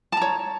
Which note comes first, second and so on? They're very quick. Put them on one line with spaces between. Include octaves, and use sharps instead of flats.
A5 A#5 C#5